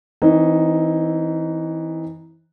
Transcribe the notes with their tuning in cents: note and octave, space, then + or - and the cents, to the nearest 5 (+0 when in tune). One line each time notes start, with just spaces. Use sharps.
E3 -20 C4 +0 D#4 +0